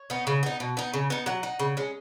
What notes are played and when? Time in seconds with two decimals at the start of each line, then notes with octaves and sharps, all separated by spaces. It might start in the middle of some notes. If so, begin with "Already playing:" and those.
Already playing: C#5
0.10 B3 D#4
0.27 C#3
0.43 B3 D#4
0.60 B2
0.77 B3 D#4
0.93 C#3
1.10 B3 D#4
1.26 F#3 F#5
1.43 D#4
1.59 C#3
1.77 G#3 C#4